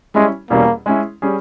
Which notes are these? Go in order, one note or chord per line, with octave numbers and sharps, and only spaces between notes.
G3 G#3 C#4 E4
E2 B2 G3 A#3 C#4
G#3 C#4 E4
G3 C#4 G#4